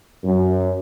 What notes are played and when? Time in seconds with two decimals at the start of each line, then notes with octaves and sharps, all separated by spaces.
0.24 F#2